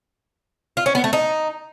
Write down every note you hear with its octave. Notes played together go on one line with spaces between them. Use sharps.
F4
C#4
B3
A3
D#4